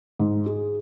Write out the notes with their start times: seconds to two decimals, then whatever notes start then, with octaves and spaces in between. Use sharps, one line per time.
0.19 G#2
0.46 G#4